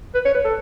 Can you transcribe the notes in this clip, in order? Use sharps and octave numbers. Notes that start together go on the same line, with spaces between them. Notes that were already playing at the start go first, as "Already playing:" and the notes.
B4
C#5
B4
A4